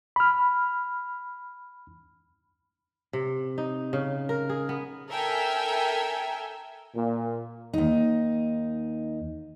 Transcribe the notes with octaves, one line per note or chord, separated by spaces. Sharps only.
B5 F6
C3
D#4
C#3
A#4
G#4
B3
A4 A#4 E5 G5 G#5
A#2
D#2 D#4